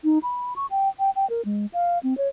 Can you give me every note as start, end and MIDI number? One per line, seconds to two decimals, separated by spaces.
0.04 0.19 63
0.23 0.54 83
0.56 0.66 85
0.71 0.89 79
0.99 1.10 79
1.16 1.28 79
1.30 1.42 70
1.45 1.66 56
1.73 1.99 77
2.03 2.16 60
2.18 2.28 73